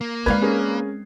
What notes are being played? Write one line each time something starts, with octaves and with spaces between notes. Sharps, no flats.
A#3
G#3 C4 B4 D5 F5 G#6
C#4 G#4 A#4